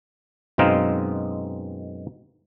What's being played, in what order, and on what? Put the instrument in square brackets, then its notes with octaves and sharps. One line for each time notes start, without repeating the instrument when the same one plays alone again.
[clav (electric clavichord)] F#2 B2 G#3 C4 D#4 F5